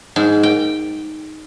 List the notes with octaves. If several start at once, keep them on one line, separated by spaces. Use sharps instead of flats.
G#2
G5